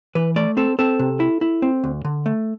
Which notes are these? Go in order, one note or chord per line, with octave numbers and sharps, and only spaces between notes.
E3 B4
A3 D5
C4 A4
C4 A4
C3
E4
E4
C4
D2
D3
A3